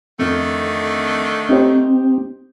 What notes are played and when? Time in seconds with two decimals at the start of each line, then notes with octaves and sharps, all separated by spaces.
0.19 F2 D3 D#3 A3
1.49 C4 D#4 G4 C5